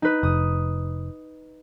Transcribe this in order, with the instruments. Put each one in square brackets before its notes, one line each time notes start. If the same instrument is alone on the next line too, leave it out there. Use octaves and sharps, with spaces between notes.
[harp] D#4 B4
[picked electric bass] F1 [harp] D#6